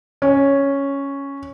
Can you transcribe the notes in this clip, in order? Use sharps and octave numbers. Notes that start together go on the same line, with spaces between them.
C#4